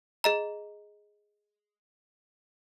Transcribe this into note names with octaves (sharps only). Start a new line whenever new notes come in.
G#4 D#5 A#5